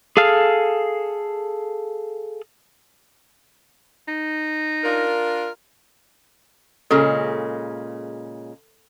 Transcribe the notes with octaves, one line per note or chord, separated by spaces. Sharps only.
G#4 A4 F5 F6
D#4
D4 F4 A#4
A#2 C#3 G#3 A4